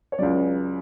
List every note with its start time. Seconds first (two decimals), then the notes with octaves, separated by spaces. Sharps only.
0.12 C#5
0.19 C#2 C#3 F#3 D5